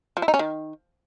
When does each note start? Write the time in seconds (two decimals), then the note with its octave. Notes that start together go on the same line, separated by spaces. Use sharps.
0.17 F3
0.22 E4
0.28 D#4
0.34 C#4
0.39 D#3